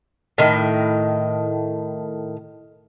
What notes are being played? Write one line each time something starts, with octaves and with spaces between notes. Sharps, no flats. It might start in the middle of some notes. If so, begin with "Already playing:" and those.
A2 D#3